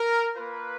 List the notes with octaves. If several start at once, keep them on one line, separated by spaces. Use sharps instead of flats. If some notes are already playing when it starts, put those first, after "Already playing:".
Already playing: A#4
A#3 F4 B4